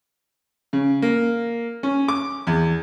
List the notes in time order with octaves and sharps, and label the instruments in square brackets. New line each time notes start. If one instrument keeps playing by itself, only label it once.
[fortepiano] C#3
A#3
C#4
D6
E2